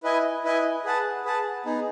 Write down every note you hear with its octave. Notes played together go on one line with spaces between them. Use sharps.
E4 B4 D#5 G#5
E4 B4 D#5 G#5
G#4 B4 F#5 A5
G#4 B4 F#5 A5
B3 D#4 G#4